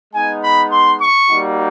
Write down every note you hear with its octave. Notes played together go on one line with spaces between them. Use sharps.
G#3 B3 D#4 G#5
B5
C6
C#6
G3 A#3 D#4 F#4